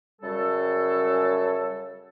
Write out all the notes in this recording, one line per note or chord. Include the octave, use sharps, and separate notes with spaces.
F#2 C#3 G3 A4